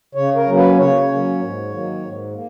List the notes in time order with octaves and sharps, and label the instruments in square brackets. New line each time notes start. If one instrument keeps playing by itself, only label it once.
[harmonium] C#3 C#5
A#4
F#3 A#3 C#4
B4
C#3 C#5
F#3 A#3 C#4
G#2
D#3 F#3 A#3
G#2
A#3